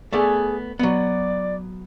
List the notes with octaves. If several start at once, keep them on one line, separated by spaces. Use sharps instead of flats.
A3 B3 G#4 D5
F#3 B3 D5